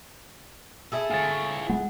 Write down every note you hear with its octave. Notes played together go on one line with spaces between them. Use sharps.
E4 G#4 A4
F4 C#5 G#5 A6
G#3 A3 F#5